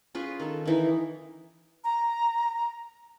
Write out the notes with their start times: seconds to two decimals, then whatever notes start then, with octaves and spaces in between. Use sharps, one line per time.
0.15 C#4 F4 G#4 B4
0.40 D#3 A4
0.66 D#3 E3 D#4
1.84 A#5